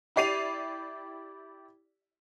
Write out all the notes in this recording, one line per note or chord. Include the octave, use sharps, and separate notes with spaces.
E4 G4 D5 C7 D#7 F7